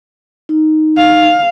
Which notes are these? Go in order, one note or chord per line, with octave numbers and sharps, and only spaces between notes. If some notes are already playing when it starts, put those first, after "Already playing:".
D#4
F5